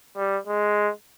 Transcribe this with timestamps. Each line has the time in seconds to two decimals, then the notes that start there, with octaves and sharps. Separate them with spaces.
0.16 G3
0.47 G#3